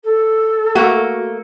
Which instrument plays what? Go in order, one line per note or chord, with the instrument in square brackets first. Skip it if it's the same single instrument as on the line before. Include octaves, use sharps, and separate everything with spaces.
[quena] A4
[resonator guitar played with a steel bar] A3 A#3 [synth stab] F#4